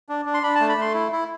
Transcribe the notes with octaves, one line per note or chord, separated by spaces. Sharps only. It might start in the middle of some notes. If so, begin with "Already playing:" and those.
D4
D4
C6
D4 B5
A3 A5
B5
A3 C6
E4
E4